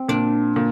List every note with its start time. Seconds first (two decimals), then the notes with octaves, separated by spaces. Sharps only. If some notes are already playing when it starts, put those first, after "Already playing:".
Already playing: C4
0.09 A#2 D4
0.56 A#2